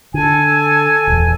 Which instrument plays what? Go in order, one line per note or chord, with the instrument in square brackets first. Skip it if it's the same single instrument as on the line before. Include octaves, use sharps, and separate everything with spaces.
[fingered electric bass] D3 [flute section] A4 G#5
[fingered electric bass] D#1 E2